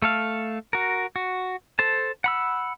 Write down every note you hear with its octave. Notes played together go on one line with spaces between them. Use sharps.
A3 A4 F5
F#4 A#4
F#4
A4 C5 A5
F#5 B5 E6